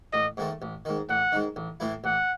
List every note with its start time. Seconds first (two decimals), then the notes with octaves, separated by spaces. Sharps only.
0.13 A1 D#5
0.37 G#2 D#3 A3
0.62 A1
0.85 G#2 D#3
1.09 A1 F#5
1.32 G#2 D#3
1.56 A1
1.80 A2 E3 A3 E4
2.04 A1 F#5